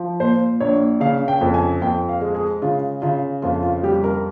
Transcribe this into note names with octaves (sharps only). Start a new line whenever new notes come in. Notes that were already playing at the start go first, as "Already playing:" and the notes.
Already playing: F3
A#2 C5
A#1 C#5
C#3 F5
G5
F2
G#5
F2 G5
F5
G#3
G#4
C#3 F4
C#3 F4
F2 F4
F4
G3 G4
A#4